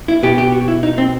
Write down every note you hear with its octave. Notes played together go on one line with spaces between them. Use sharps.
E4
B2 G4
G4
F#4
E4
D#4
C4